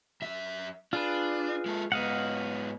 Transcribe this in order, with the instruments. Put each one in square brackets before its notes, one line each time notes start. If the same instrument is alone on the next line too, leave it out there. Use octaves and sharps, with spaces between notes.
[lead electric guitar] F#2 E5
[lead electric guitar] D4 [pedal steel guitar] F4 G#4 B4
[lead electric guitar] G#3 A4
[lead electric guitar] G#2 B3 [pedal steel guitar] D#5 F5 F#5